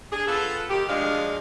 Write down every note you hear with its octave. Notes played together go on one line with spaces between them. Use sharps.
D4 G#4
B3 F4 A4
D#3 G4
D2 F3 G#3 D4 F5